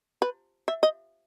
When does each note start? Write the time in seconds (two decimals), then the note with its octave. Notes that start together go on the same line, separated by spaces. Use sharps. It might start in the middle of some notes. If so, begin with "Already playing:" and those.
0.22 B4
0.68 E5
0.83 D#5